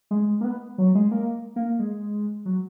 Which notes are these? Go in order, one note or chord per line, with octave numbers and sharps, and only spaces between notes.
G#3
A#3
B3
F#3
G#3
A#3
A#3
G#3
F#3